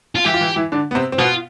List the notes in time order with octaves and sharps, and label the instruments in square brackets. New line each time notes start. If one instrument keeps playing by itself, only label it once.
[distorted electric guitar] F4
[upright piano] E3 E4 [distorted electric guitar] G4
[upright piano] F4
E3 E4
E3 E4
D3 D4
B3
C3 C4
C4
[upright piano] B2 B3 [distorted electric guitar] F4